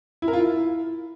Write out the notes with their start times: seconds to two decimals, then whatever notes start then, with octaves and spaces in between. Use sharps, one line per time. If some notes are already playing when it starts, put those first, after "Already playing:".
0.22 E4
0.28 A#4
0.33 F4
0.39 E4